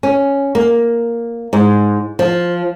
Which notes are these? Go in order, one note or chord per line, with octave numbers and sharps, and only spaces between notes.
C#4
A#3
G#2
F3